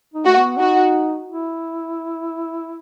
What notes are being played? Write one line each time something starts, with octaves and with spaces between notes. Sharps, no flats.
D#4
A3 F#4
B3
D#4 F#4
E4